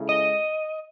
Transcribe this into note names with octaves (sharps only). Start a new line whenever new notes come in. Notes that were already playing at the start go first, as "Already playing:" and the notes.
Already playing: C#3 G#3 C#4 E4 A4
D#5